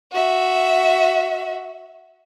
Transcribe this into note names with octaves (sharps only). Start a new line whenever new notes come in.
F#4 E5